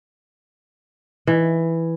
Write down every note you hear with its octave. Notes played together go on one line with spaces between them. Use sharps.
E3